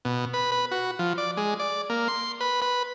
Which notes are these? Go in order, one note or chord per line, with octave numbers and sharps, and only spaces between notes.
B2
B4
B4
F#4
F3
D5
G#3
D5
A#3
C6
B4
B4